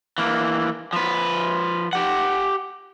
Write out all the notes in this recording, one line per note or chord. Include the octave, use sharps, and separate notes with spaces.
E3 A#3
F3 B4
G4 F#5